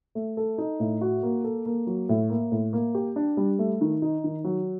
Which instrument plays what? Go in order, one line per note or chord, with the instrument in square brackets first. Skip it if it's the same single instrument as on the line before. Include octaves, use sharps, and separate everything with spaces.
[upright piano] A3
A4
D#4
A2
F#4
A#3
A4
A#3
F#3
A2
A#3
A2
A#3
G4
D4
G3
A3
D#3
D#4
D#3
F#3